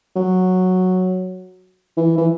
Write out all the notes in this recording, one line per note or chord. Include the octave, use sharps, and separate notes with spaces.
F#3
E3
E3